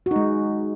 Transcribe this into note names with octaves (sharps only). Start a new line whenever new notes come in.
G#3 D#4 F#4